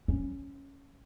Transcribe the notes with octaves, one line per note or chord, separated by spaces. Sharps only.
C#4